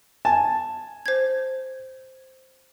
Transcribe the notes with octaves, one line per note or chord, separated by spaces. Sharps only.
G#5 A5
C5 G#6